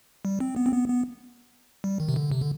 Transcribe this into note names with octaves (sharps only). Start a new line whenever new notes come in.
G3
C4
B3
C4
B3
B3
G3
D#3
C3
D3
C3
D3